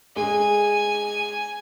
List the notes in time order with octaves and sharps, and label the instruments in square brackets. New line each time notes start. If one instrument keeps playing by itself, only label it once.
[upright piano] G#3 [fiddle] G#5